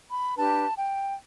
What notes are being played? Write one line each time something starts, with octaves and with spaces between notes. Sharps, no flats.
B5
D4 G4 B4 A5
G5